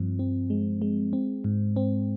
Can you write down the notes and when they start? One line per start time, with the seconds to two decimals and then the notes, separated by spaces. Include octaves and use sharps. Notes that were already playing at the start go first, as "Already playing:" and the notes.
Already playing: G2 F3 C4
0.19 C4
0.50 G#3
0.82 G#3
1.13 C4
1.44 G#2
1.76 C4